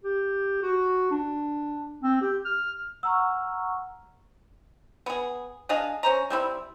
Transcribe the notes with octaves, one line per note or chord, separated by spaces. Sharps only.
G4
F#4
D4
C4
G4
F6
F#5 A#5 C#6 E6 F6
B3 G#4
D4 G#4 D#5 F5
C#4 C5 A#5
G3 C4 E4